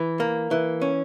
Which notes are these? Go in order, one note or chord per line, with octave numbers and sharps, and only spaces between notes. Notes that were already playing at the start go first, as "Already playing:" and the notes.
Already playing: E3
A#3
E3
C#4